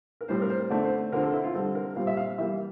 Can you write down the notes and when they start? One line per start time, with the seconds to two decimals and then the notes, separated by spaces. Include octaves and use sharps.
0.21 A#4
0.28 A2 G3 C4 C5
0.42 A#4
0.49 C5
0.70 D3 A3 C4 D5
0.84 C5
1.12 D3 F3 C4 A#4
1.23 A4
1.33 E4
1.44 F4
1.54 D3 G3 C4 A4
1.75 A#4
1.96 A#2 G3 C4 F5
2.07 E5
2.17 F5
2.38 E3 G3 A#3 E5